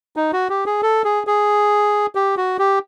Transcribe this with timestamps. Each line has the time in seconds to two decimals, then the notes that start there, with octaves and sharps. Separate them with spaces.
0.16 D#4
0.33 F#4
0.49 G4
0.66 G#4
0.83 A4
1.04 G#4
1.27 G#4
2.15 G4
2.37 F#4
2.59 G4